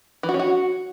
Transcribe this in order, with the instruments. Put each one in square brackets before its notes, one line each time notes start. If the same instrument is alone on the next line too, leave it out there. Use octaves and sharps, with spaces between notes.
[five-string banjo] E3
F#4
C#4
F#4